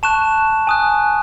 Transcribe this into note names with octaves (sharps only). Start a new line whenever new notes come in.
A5 C#6 F#6 E7
G#5 D#6 F#6